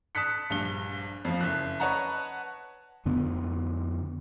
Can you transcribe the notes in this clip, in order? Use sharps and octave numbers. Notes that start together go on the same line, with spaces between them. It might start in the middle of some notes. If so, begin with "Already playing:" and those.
A5 D#6 F#6 B6 C#7
A#1 G2 G7
F2 F3
F#1 F#6
B4 C#5 D#5 F#5 A5 A#5
F2 D3 B3